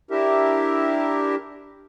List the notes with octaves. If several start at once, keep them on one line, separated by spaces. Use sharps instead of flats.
D4 E4 G4 A#4 E5